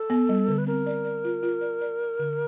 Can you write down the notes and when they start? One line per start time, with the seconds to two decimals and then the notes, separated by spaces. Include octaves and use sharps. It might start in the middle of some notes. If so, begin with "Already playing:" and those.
Already playing: A4
0.10 B3
0.29 G3
0.48 D3
0.58 B4
0.67 C4 A#4
0.86 D5
1.04 D5
1.24 F4
1.43 F4
1.61 D5
1.81 D5
2.00 D5
2.19 D3